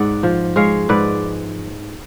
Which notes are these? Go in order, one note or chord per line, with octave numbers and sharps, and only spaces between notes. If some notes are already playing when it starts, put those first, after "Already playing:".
Already playing: G#2 D5 F#5
F3
G#3 C#5 F5
G#2 B4 D5